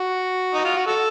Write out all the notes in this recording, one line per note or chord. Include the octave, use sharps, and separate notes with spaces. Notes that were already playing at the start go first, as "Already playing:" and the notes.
Already playing: F#4
D#4
F4
F#4
F#4 A4